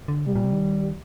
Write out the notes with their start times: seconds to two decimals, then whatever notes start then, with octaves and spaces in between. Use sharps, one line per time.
0.08 D3
0.26 C3 G3
0.36 A#2
0.44 C3
0.53 D#3